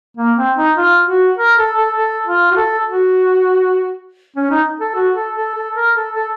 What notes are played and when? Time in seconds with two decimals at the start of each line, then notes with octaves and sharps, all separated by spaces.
0.17 A#3
0.37 C4
0.57 D#4
0.77 F4
1.07 F#4
1.37 A#4
1.57 A4
1.76 A4
1.97 A4
2.26 F4
2.51 F#4
2.56 A4
2.86 F#4
4.36 C#4
4.51 D#4
4.80 A4
4.95 F#4
5.16 A4
5.36 A4
5.55 A4
5.75 A#4
5.95 A4
6.15 A4